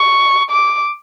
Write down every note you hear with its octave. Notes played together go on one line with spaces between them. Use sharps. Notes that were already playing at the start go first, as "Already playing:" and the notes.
Already playing: C#6
D6